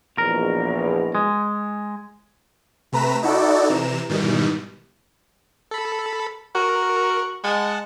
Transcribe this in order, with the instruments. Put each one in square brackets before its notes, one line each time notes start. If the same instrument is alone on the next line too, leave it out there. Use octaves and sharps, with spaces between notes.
[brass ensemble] A#1 E2 B2 [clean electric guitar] A#4
[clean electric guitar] G#3
[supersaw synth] C3 A3 B4 A#5 B6 E7
D#4 E4 F#4 A4 D5
C3 E3 A#5 E7
G#2 B2 D#3 E3 G3
[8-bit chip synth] A4 B5
[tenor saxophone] F#4 [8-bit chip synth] A#4
[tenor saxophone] G#3 [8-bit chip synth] F#5 A5